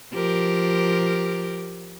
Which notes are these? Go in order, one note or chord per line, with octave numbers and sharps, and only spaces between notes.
F3 G4 A#4